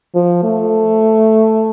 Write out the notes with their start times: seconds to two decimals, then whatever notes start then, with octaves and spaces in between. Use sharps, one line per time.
0.15 F3
0.44 A3